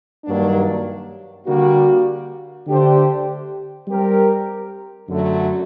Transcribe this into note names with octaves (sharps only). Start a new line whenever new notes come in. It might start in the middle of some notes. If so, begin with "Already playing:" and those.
G2 D#3 F#3 A#3 D4
D3 G3 A#3 F#4
D3 A3 D4 G4 C5
G3 C4 G4 A#4
F#2 D3 F#3 A3